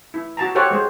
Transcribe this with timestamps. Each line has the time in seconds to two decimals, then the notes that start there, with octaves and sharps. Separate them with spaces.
0.14 E4
0.37 F#4 A5 A#5
0.55 G4 A4 C5 C#5 F#5 A5
0.71 G#3 C5